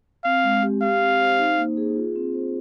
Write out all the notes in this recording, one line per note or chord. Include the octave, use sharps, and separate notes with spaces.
C4 F5
G#3
G4
G4 F5
C4
C5
D#4
A#3
G#4
F4
C4
C5